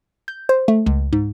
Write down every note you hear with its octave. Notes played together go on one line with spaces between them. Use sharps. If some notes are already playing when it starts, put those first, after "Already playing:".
G6
C5
A3
C#2
G#2